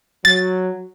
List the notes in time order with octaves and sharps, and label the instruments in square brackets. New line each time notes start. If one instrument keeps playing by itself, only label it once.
[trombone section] F#3 [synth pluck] A6